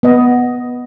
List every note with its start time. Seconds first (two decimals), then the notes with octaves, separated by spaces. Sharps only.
0.03 B3 D#5